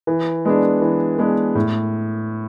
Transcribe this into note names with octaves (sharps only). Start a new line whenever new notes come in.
E3
G#3 B3 D4
E3
G#3 B3 D4
A2